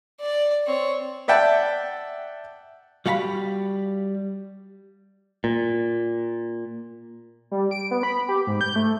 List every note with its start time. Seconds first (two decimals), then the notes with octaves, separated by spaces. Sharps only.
0.20 D5
0.66 C4 C#5
1.28 D5 E5 F#5 G5 A5
3.06 G3 F#4 F5 A#5 B5
5.44 A#2
7.51 G3
7.71 D7
7.91 B3
8.03 B5
8.29 G4
8.47 G#2
8.61 G6
8.76 A3